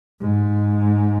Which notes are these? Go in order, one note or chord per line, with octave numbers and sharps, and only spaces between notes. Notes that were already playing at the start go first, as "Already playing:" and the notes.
G#2